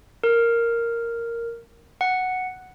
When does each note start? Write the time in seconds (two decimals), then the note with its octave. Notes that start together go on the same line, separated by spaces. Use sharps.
0.24 A#4
2.01 F#5